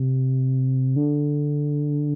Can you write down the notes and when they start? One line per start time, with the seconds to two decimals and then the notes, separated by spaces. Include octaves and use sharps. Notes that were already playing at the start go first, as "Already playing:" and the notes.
Already playing: C3
0.96 D3